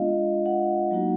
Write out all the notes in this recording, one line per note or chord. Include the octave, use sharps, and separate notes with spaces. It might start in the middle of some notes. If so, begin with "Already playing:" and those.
Already playing: G#3 B3 D4 F4 D#5 F5
F#5
F#3 A#3 D#4 F#4